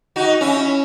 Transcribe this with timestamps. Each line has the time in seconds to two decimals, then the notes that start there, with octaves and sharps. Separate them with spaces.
0.16 D#4 F#4
0.41 C#4 E4